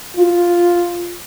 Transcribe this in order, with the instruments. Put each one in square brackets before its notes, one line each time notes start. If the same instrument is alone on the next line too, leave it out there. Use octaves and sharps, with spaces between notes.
[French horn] F4